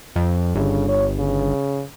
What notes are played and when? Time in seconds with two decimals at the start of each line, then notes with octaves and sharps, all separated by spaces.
0.16 F2
0.55 G1 C#3
0.89 C#5
1.19 C#3